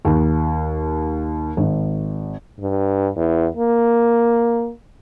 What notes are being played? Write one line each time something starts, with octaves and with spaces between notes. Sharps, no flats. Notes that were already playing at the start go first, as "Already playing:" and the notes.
D#2
G#1
G2
E2
A#3